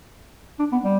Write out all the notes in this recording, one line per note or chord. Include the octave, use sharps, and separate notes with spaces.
D4
B3
G3